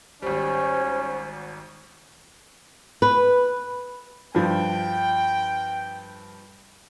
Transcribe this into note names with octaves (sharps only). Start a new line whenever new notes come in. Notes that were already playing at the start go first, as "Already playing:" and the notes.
G#1 G3 C#4 C5
B4
G2 F3 G5